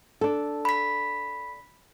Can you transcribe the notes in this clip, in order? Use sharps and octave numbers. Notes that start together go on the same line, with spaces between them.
D4 A4
B5 B6